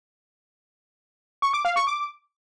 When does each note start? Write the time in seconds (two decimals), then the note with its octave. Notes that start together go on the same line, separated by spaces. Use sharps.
1.42 C#6
1.53 D6
1.65 F5
1.76 C#6
1.87 D6